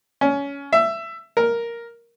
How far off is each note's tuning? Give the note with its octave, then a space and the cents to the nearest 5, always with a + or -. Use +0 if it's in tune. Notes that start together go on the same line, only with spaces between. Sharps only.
C#4 +20
E5 +15
A#4 +0